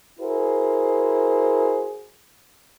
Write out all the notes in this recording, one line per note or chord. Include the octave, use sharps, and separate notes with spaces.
E4 F#4 G#4 A#4 C5